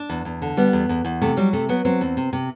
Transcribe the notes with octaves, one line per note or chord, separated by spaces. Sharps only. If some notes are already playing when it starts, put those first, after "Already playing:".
Already playing: D4
E2
E2
D3
G3 B3
E2
E2
E2
C3 A3
F#3 G3
C3 A3
F#3 B3
F#3 C4
E2
C3
C3